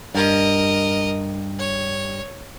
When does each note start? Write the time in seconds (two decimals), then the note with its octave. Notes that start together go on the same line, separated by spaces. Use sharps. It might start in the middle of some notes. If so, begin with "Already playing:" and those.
0.15 G2 A#4 D#5
1.59 C#5